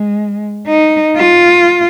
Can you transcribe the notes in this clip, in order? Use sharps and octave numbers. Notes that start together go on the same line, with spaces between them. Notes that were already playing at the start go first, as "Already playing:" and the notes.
Already playing: G#3
D#4
F4